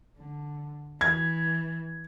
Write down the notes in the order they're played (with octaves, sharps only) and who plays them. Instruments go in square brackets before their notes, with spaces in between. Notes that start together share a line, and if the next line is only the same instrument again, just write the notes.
[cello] D3
[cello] E3 [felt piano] G#6